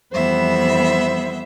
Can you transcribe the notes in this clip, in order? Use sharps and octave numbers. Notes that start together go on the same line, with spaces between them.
F2 E3 G3 B3 C5 E5